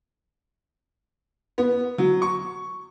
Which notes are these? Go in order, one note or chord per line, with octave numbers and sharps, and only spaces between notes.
B3
F#3
C#6